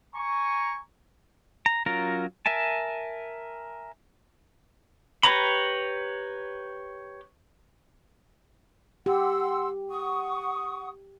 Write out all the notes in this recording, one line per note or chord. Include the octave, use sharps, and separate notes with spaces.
G#5 A#5 C#6
A#5
F#3 C#4 F4 A#4 A#5
A#4 E5 G#5 A5
G4 B4 C#5 A#5 B5
G4 F#5 C6 E6
F#5 C#6 D#6